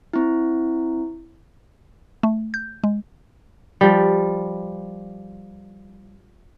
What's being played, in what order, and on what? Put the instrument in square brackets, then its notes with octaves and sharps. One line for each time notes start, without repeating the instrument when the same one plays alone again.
[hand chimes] C4 E4
[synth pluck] A3
G6
G#3
[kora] F3 G3